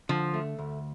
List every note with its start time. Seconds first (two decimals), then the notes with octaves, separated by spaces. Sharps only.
0.09 D3 F3
0.34 A3
0.59 D2